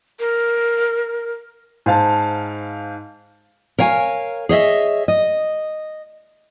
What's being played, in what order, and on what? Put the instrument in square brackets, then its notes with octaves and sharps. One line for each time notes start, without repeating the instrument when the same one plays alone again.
[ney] A#4
[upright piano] G#2 C5 F5 A5
[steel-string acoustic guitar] A#4 C#5 F5 G#5
G#4 C#5 D#5 E5
D#5